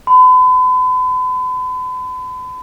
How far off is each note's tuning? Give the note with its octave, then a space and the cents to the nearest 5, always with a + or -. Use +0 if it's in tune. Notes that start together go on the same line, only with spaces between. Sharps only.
B5 +40